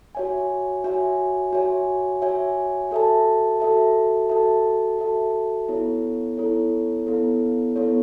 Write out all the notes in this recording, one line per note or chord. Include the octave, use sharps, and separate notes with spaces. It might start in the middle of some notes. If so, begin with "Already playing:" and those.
F#4 C#5 E5 G#5
F#4 C#5 E5 G#5
F#4 C#5 E5 G#5
F#4 C#5 E5 G#5
F#4 A4 E5 A5
F#4 A4 E5 A5
F#4 A4 E5 A5
F#4 A4 E5 A5
B3 E4 A4 C#5
B3 E4 A4 C#5
B3 E4 A4 C#5
B3 E4 A4 C#5